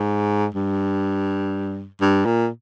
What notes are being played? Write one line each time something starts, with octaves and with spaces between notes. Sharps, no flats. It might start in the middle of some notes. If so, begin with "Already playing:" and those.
Already playing: G#2
G2
G2
A#2